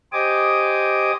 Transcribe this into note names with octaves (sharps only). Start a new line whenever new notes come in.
G4 C5 D#5 G#5 D6 D#6